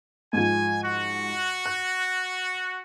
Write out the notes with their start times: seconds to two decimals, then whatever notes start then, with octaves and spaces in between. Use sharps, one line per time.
0.33 G#2 F3 G#5
0.83 F#4
1.66 F#6